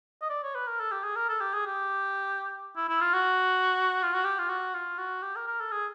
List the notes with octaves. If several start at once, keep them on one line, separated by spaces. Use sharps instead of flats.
D#5
D5
C#5
B4
A#4
A4
G4
G#4
A#4
A4
G4
G#4
G4
E4
E4
F4
F#4
F4
F#4
G4
F4
F#4
F4
F#4
G4
A#4
A#4
A4
G#4